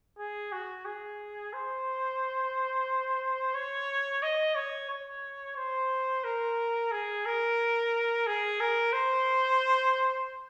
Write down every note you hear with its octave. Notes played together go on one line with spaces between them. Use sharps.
G#4
F#4
G#4
C5
C#5
D#5
C#5
C#5
C5
A#4
G#4
A#4
G#4
A#4
C5